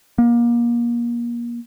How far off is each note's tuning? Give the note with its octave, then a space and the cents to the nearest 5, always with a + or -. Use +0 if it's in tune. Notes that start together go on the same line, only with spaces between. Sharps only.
A#3 +30